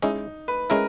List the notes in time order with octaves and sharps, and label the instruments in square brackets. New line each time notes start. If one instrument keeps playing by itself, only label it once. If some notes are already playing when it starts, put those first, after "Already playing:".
[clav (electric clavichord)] G#3 C#4 E4 [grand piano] D#4
[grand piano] B4
[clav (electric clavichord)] G#3 C#4 E4 [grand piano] A#4